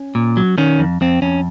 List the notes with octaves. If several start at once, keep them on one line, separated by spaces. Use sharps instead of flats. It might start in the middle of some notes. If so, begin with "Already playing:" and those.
Already playing: C#4
A#2
F#3
D#3 C#4
F2
F2 C4
F2 C#4